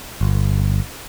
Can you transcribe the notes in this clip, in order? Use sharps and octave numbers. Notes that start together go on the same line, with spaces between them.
G1